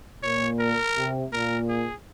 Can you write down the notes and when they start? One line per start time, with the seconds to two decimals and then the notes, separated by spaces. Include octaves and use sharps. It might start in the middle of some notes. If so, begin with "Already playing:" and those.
0.23 A#2 C#5
0.59 A#4
0.97 C3
1.32 A#2 A#4
1.69 G#4